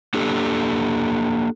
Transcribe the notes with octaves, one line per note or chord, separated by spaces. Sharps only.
A#3 D4 G4 A4